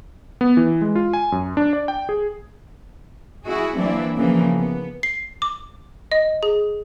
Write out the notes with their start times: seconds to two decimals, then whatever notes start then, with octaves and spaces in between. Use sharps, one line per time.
0.41 B3
0.57 E3
0.81 G#3
0.95 F4
1.13 G#5
1.32 F#2
1.57 D4
1.73 D5
1.88 G5
2.09 G#4
3.44 E4 F#4 G#4
3.76 E3 F#3 A#3 C4 D4 E4
4.17 C#3 E3 F3 A#3
4.56 B3
5.03 C7
5.42 D6
6.12 D#5
6.43 G#4